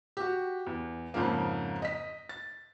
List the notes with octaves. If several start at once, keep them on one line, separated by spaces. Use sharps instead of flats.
F#4 G4
E2
F2 G#2 C#3 F3 A#3
D#5 B6
A6